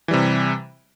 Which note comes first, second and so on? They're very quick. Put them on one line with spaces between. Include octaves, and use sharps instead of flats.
E3 G3 C3